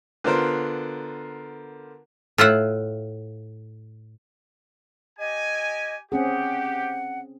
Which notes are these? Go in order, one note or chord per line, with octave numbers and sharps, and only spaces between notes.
D3 B3 F4 A#4 C5
A2 F4 E5 F#5
G4 D#5 G#5
C4 C#4 G4 G#4 F#5